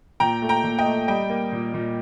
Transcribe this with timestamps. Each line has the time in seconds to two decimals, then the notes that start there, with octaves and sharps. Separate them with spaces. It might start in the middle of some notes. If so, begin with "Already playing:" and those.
0.20 A#2 G5 A#5
0.42 A3
0.49 G5 A#5
0.64 A#2
0.79 D#5 G5
0.86 A3
1.08 G3 D#5 G5
1.30 A#3
1.52 A#2
1.74 A#2